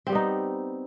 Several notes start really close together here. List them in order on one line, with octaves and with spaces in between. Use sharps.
C4 G3 B3 D#4